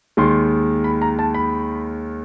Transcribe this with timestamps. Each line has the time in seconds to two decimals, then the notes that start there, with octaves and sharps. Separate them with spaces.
0.17 D#2 D#3 G#3 C6
0.84 B5
1.02 A#5
1.19 A5
1.34 B5